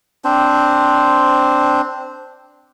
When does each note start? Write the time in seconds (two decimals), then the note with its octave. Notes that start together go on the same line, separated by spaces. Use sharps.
0.24 C4 D4 C5